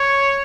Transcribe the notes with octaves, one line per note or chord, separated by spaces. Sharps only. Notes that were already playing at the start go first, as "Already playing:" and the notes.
Already playing: C#5